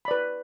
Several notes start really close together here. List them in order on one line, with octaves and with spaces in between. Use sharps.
B5 D5 B4